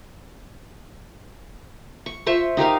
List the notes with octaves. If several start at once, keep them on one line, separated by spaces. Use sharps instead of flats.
C#6
F4 C5 E5 C#6
D#4 G4 A#4 F5